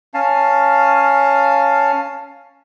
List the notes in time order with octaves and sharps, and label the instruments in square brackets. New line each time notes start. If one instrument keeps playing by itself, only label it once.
[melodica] C#4 F5 A5